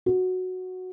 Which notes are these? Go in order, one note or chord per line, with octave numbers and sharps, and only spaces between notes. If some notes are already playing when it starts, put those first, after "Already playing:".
F#4